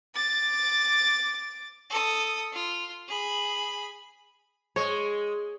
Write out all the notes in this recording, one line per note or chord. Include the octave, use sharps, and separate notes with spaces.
D6 A6
A4 D#6
F4
G#4 B5
G#3 C#5